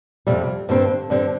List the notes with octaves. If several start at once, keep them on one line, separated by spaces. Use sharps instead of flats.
F2 C3 G3
G2 D3 G3 C4
G2 D3 G3 C4